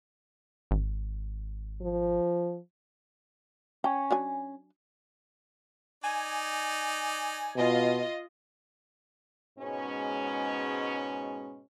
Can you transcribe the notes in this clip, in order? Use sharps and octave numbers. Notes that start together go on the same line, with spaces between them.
G#1
F3
C#4 G5
F#3 D4 G#5
D#4 D5 G#5
B2 F4 D#5
G#2 B2 G#3 C#4